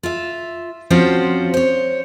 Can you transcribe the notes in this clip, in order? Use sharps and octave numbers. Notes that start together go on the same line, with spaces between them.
F4 E5
F3 C4 C#4 F4 F#4 C5
C5 C#5